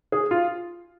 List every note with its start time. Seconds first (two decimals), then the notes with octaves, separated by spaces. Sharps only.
0.12 G#4
0.31 F4